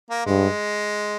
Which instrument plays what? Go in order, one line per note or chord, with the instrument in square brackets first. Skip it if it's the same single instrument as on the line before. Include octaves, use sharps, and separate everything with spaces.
[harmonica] A#3
[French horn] G2 [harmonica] G#3